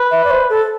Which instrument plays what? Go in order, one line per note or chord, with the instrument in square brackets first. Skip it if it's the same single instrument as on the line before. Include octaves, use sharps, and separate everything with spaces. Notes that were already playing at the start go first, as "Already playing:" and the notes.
Already playing: [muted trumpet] B4
[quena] E5
D5
C5
A4